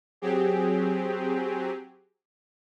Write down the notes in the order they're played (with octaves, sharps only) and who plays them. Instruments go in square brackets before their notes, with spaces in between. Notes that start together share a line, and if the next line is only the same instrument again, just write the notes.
[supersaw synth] F#3 C4 G4 G#4